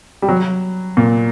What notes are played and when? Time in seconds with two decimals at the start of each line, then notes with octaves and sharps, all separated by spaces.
0.22 G3
0.29 F#3
0.97 A#2